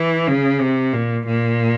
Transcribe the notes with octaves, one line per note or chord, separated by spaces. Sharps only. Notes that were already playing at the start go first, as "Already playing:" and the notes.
Already playing: E3
C#3
C3
A#2
A#2